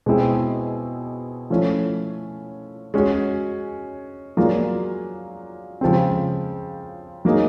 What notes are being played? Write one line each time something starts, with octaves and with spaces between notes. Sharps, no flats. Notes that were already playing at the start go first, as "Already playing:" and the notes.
B2 G#3 C4 E4 G#4
F3 A3 C#4 E4
G#3 C#4 F#4
F#3 A#3 D4 F4 G#4
C#3 F3 G#3 C4
F#3 A#3 D#4 G#4